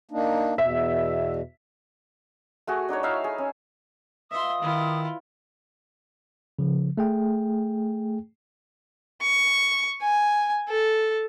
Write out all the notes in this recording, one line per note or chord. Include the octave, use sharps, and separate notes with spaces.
A#3 D4 D#4
E2 B2 E5
A3 F#4 G#4
D4 D#4 F#4 C#5
D#4 E4 E5 F5
G#4
C#4
F4 B4 D#5 E5 C6 D#6
D#3 E4 F4 B4 F5
C#3 F3
A3 G#4 G5
C#6
G#5
A4